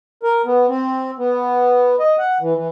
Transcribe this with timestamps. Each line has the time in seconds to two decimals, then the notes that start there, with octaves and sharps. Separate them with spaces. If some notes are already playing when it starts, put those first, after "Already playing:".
0.23 A#4
0.45 B3
0.69 C4
1.18 B3
2.00 D#5
2.19 F#5
2.41 E3
2.55 E3